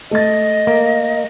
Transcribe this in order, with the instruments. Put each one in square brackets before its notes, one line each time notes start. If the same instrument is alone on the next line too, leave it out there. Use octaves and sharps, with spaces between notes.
[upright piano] A3 A6 [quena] D#5
[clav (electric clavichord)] A#3